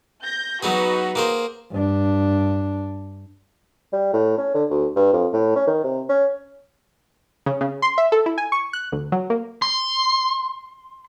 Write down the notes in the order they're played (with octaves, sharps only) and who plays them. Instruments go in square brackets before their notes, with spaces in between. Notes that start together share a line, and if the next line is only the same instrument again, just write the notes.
[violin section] G6 A#6
[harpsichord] F#3 B3 G#4 [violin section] D#4 F#4 B4
[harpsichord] A#3 G#4 C5
[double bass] G2 D4
[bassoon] G3
A2
C#4
D3
D2
G2
F2
A2
C#4
D#3
C3
C#4
[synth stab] C#3
C#3
C6
E5
A4
E4
G#5
C#6
F#6
D2
F#3
A#3
[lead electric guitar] C6